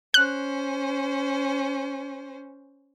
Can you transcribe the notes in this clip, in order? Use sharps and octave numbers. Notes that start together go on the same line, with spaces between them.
C#4 C5 F#6